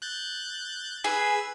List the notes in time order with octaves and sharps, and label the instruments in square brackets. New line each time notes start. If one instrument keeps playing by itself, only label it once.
[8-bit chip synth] F#6 G6 A6
[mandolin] G#4 [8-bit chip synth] B4 E6 G#6